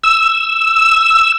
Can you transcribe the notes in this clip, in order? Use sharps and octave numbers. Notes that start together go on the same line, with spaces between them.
E6